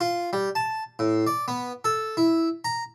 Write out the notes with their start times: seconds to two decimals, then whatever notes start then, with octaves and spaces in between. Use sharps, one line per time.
0.01 F4
0.33 G3
0.55 A5
0.99 A2
1.27 D5
1.48 B3
1.84 A4
2.17 E4
2.65 A#5